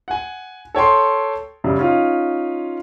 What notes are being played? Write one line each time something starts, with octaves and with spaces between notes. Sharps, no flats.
F#5 G#5
A4 C#5 G5 C6
F#2 C#3 G3
C#4 D#4 F4